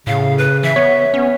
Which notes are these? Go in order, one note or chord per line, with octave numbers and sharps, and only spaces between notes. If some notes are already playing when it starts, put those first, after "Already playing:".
A2 C#3 F5
B4
E3 E5
B3 C#5
B3 C#4